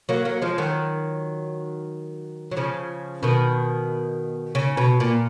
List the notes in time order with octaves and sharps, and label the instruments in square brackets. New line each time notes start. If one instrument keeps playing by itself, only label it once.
[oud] F#3 A#3
F#3 A#3
F3 G#3
D#3 F#3
F#3
C#3 F3
B2 D#3
C#3
B2
A#2